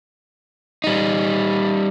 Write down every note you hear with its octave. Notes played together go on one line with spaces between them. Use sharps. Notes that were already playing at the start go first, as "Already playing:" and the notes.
G3 D#4